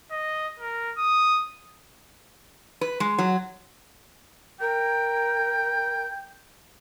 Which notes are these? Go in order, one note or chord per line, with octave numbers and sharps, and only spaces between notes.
D#5
A#4
D#6
B4
G#3
F#3
A#4 G5